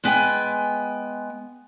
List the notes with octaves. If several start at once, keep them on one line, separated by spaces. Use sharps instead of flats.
G#3 B3 G5 G#5